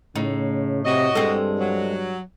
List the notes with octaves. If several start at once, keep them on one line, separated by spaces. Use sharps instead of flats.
A2 C#3 D#4
C3 F#4 D#5
G2 G#3 C4 A4
F#3